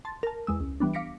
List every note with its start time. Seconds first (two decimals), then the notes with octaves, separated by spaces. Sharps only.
0.05 A5 C6 A6
0.23 A#4 A5
0.47 E2 G#3 E6
0.60 C#2
0.80 E3 G3 B3 D4
0.94 F5 D6 A#6 B6 C#7 D7